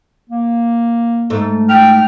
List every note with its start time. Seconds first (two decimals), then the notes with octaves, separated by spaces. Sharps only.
0.29 A#3
1.30 G#2 A3
1.69 G5 F6